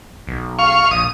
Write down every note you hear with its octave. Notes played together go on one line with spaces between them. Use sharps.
B1
F5 C#6
A#1 D#6